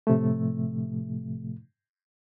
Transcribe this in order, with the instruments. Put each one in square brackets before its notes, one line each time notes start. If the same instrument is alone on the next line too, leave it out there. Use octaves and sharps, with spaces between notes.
[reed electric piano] A2 C3 F3 A3